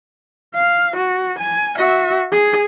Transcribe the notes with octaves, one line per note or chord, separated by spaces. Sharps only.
F5
F#4
G#5
F#4 E5
G#4